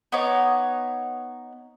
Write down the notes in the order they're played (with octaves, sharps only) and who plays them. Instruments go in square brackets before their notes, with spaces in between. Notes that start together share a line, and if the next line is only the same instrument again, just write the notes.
[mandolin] B3 D#4 C#5 D6